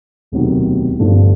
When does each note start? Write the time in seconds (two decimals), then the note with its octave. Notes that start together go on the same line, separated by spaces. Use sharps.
0.32 E1 D2 C3 D#3 F#3
0.99 G1 G2 D3 F3 A3